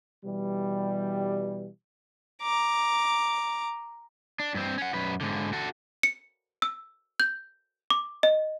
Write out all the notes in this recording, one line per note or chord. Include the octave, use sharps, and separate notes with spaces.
B2 E3 G3
A#5 D6
D4
G2 C4
C#4 F#5
F#2 B4
G#2 D3
F#4 A4
C#7
E6
G6
D6
D#5